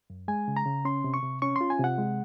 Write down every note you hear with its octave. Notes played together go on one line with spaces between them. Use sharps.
F#2
G#3 G#5
C#3
A#5
C#3
C#4 C6
C3
C#6
C3
C#4 C#6
F4 C6
G#5
C3 F#5
G#3